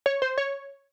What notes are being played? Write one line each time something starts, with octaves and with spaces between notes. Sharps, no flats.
C#5
C5
C#5